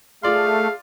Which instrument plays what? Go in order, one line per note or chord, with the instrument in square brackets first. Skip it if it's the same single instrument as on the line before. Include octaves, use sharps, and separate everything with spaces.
[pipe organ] A3 [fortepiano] F4 D5 C6 [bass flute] G#4 [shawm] F5